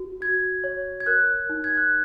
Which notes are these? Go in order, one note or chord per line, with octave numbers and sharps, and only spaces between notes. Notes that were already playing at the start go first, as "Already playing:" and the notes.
Already playing: F#4
F#4 G#6
C#5
G#6
A#4 F#6
D#4
G#6
F#6